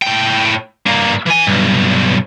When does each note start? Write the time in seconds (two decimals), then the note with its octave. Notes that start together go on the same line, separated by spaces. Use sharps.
0.02 A2 G5
0.86 G2 A#3
1.26 E3 G#5
1.47 B1 G2